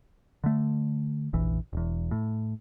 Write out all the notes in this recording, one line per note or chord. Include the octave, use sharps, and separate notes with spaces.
D3 A3
F1 A#1 E3
E1 E2
A2